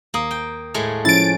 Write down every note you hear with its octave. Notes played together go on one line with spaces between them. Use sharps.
D#2 A#3 D#6
G5
A2 G#3 A3
F3 C#4 E4 A6 D7